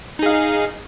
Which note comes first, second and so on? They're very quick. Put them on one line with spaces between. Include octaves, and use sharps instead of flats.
D#4 G#4 F5